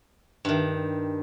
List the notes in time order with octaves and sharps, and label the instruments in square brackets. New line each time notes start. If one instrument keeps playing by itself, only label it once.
[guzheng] G2 D#3